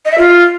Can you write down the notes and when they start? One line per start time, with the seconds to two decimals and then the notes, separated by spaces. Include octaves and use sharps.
0.05 D#5
0.12 E5
0.18 F4